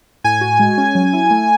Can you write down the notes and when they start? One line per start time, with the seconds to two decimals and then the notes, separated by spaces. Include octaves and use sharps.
0.24 A2 G#5
0.41 F#4
0.59 G#3
0.78 C#4
0.95 F#3
1.13 E4
1.31 A3